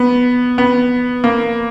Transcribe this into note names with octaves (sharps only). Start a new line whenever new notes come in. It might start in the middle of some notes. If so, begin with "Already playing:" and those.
Already playing: B3
B3
A#3